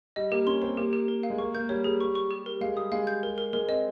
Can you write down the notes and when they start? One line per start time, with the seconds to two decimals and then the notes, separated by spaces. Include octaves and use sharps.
0.16 G3 D#5
0.31 A#3 G4
0.47 C#4 C6
0.62 C4 C6
0.77 A#3 G4
0.93 G4
1.08 A#4
1.23 F5
1.30 G#3
1.38 A#3 C#6
1.55 A#3 G6
1.69 G3 C#5
1.84 G3 G#4
2.00 C#6
2.15 C#6
2.31 G4
2.46 A#4
2.61 G#3 F5
2.76 G3 D#6
2.92 G#3 F5
3.07 G6
3.23 A#4
3.38 A#4
3.53 G#3 A#4
3.68 C4 D#5